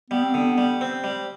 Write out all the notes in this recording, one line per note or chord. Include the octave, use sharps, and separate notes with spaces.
G3 B3
C4
D3 B3
G3
C4
G3